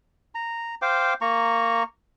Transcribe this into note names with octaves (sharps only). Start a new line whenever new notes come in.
A#5
C5 F5 G5 D6
A#3 A#5 C#6